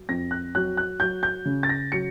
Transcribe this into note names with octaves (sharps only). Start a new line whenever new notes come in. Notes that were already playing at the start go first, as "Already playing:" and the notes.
Already playing: F#3
F2 A#6
F#6
F#3 F#6
F#6
F#3 G6
G6
C#3
A6
A#6
F#3 C#7